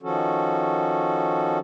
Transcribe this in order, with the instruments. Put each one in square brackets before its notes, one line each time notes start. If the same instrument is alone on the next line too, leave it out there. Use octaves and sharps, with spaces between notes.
[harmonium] D#3 F3 C#4 F#4 A4